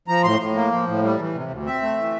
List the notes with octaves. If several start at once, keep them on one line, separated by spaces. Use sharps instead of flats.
F3 A#5
A2 C6
A2
A#3
F3
A2
G3
E3
C3
D2
C4 E5
A3
E3